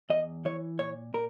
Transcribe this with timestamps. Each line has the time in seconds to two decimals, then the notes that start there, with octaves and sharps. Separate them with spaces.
0.10 E2 D#5
0.45 E3 C#5
0.79 A#2 C#5
1.14 A#2 A#4